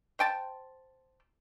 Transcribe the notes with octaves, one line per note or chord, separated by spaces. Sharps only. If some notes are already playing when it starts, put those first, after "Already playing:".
C5 G5 A5